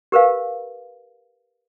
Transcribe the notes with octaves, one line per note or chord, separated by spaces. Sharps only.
G4 A#4 B4 F5